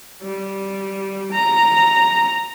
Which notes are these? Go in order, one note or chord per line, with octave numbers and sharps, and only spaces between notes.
G3
A#5